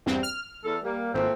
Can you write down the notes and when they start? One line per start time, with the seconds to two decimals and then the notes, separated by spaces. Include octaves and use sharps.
0.06 E2 G2 C4
0.23 F6
0.64 E2 A4
0.83 G3 A#3
1.14 G#1 A#2 A3 C4